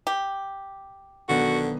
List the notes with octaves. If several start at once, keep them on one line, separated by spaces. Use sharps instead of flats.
G4
B1 D3 D#3 B3 F#4